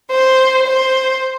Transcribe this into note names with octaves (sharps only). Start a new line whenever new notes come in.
C5
C5